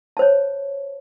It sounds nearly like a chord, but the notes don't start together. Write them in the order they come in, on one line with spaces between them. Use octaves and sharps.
A5 C5 C#5